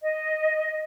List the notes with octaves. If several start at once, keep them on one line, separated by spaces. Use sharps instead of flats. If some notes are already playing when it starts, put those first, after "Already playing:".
D#5